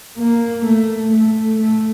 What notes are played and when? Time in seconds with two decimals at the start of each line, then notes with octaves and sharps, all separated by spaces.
0.17 A#3
0.65 A3
1.12 A3
1.60 A3